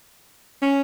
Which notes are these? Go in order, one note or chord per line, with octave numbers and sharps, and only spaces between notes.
C#4